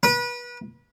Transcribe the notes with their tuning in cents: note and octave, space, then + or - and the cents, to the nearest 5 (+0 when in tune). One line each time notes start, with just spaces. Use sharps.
B4 -30